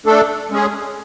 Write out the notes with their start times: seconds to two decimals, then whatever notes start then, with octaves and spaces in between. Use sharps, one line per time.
0.06 A3 D4 A4
0.51 G#3 C#4 G#4